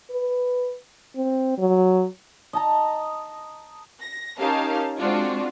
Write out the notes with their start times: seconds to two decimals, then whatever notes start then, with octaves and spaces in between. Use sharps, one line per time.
0.10 B4
1.16 C4
1.58 F#3
2.53 D#5 A5 A#5
4.00 A#6
4.39 C#4 D#4 G4 A#4 F5 A5
4.99 G#3 C4 D4 F4 F#4